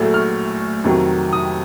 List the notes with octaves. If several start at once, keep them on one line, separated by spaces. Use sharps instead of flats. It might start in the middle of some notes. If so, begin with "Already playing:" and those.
Already playing: A#1 A2 F#3 A3
F6
F2 C3 D#3 F#3
D#6